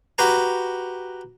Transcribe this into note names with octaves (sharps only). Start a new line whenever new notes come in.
F#4 G4 B4 A#5